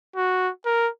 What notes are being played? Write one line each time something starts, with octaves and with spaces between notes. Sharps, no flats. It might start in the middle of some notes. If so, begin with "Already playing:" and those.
F#4
A#4